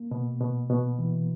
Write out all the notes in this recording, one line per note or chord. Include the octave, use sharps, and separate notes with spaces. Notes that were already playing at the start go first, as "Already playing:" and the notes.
Already playing: A#3
B2
B2
B2
E3